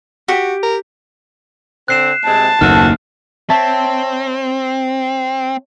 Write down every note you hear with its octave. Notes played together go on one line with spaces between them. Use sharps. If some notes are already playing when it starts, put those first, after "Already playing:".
F#4 G4
A#4
D3 C4 F#6 C7 E7
C3 G#3 C4 A5
F#1 D#2 D#3 A3 C4 F#4 F6
C4 C#5 E5 A5